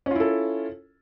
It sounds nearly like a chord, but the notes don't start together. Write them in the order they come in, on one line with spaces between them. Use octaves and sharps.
C#4 F4 E4 A4